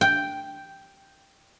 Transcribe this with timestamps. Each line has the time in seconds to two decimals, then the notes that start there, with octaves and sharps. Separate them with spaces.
0.01 G5